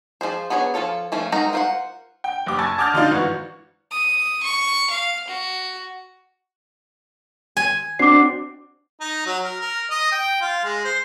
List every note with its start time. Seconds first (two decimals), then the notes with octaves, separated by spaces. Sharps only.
0.21 F3 A3 G#4 C5
0.50 B3 D4 G#4 A#4 C#5
0.74 F3 C4 F4 A4 C#5
1.12 F3 A3 C#4
1.32 G#3 C4 D#4 F#4 A#4
1.53 F4 A#4 C5 C#5 F#5
2.24 G5
2.46 F#1 G4 D6
2.58 G#5 A5 C#6 E6 G#6 A6
2.78 A5 D6 D#6 F6 G6 A6
2.93 D3 D4 D#4 F4
3.11 G#1 E3 F#4 C#6
3.91 D#6
4.43 C#6
4.90 F5
5.28 F#4
7.57 G#5
7.99 C4 D4 F#4 D6 C7
9.00 D#4
9.26 F#3
9.44 A#4
9.61 A#4
9.90 D#5
10.12 G5
10.41 F4
10.64 G#3
10.84 C5